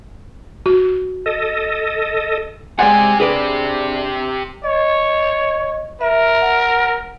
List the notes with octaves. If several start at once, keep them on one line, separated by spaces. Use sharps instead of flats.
F#4
A4 D#5
G#3 C4 G4 D5 F#5 G#5
D4 G#4 B4 D5
C#5 D#5
A#4 E5
F#5